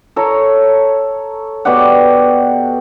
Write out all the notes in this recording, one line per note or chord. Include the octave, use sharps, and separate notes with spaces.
A4 C#5 A#5
B2 G4 D5 F#5